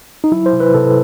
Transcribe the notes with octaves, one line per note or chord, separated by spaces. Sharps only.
D#4
F#3 E4
C5
C3
B4
C3 A4